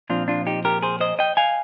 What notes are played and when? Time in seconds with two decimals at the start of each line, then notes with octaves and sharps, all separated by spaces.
0.10 A#2 F3 C4 D4 F4
0.28 D4 F4
0.47 D#4 G4
0.65 G4 A#4
0.83 G#4 C5
1.00 C5 D#5
1.19 D#5 G5
1.37 F5 G#5